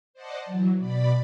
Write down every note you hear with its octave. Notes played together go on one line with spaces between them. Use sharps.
C5 D5 D#5 F#5 A5
E3 F#3
B2 D5 B5